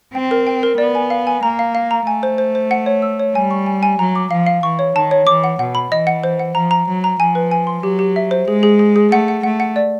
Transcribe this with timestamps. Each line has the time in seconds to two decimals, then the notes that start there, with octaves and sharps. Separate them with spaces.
0.14 C4 G5
0.31 A#4
0.47 G5
0.63 A#4
0.78 B3 D5
0.95 G#5
1.10 F5
1.27 G#5
1.43 A#3 A#5
1.59 F5
1.75 F5
1.91 A#5
2.07 A3 G#5
2.23 C5
2.38 C5
2.55 C5
2.71 F#5
2.86 C#5
3.02 E6
3.20 C#5
3.35 G3 G#5
3.51 C#6
3.66 G#5
3.83 G#5
3.99 F#3 A#5
4.16 D6
4.31 F3 F5
4.46 F5
4.63 E3 C#6
4.79 C#5
4.95 D#3 A5
5.11 C#5
5.27 E3 D6
5.44 F#5
5.59 B2 F#5
5.75 B5
5.91 E3 D#5
6.07 F#5
6.24 C5
6.39 F#5
6.55 F3 A#5
6.71 A#5
6.87 F#3 A#5
7.04 A#5
7.20 F3 G#5
7.35 B4
7.51 G#5
7.67 C6
7.83 F#3 G4
7.99 G4
8.16 E5
8.31 C5
8.48 G#3 G#4
8.63 G#4
8.79 G#4
8.96 G#4
9.11 A3 F#5
9.28 F#5
9.43 A3 F#5
9.60 F#5
9.76 D5